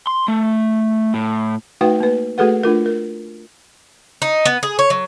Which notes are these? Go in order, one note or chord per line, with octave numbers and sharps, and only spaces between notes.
C6
A3
A2
A3 D#4 F#4 B4 F5 G5
A#3 B4
A3 F#4 G#4 A4 B4 F#5
A3 D4 F4 A#4
A#4
D#4
B3
G#4
C#5
F#3